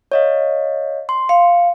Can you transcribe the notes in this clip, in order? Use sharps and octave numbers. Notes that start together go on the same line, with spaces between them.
C#5 D#5 F5
C6
F5 C#7